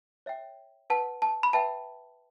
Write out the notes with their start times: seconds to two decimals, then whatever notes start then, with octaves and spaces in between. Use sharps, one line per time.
0.26 C#5 E5 G5
0.90 B4 F#5 A5
1.22 A5
1.43 B5
1.53 B4 E5 G5 A5